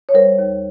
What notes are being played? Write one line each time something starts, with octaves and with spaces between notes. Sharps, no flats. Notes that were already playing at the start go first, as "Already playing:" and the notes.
C#5
G3 A#4 C5
D#2